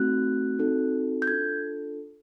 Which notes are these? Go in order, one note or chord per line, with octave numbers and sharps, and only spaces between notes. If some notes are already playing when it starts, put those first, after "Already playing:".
Already playing: A3 C4 D#4 F#4 F#6
C4 D#4 F#4 A4
G6
D4 F4 A4 G#6